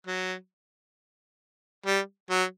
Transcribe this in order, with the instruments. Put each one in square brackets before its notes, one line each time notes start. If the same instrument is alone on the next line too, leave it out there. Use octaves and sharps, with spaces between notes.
[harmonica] F#3
G3
F#3